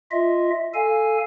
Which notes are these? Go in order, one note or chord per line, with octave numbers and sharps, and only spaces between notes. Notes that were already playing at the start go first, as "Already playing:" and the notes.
F4 D#5 E5
A4 F5 G#5